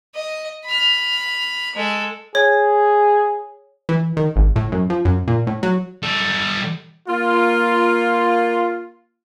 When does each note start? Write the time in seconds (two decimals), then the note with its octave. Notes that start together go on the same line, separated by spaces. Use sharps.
0.15 D#5
0.65 B5 F6
1.75 G#3 A4
2.35 G#4 C#5
3.89 E3
4.17 D#3
4.36 G#1
4.56 A2
4.72 F#2
4.90 F3
5.05 F#2
5.28 A#2
5.47 A2
5.63 F#3
6.03 G3 A4
7.08 A#3 F4